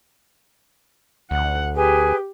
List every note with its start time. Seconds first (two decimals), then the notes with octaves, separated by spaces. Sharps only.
1.31 D2 F#5
1.76 G4 G#4 B4 G#5